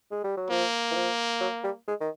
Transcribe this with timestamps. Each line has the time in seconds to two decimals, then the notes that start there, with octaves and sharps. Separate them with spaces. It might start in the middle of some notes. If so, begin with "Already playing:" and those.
0.11 G#3
0.24 G3
0.37 F#3
0.50 F3 A#3
0.91 E3
0.96 F3
1.41 F#3
1.64 G3
1.87 G#3
2.01 D#3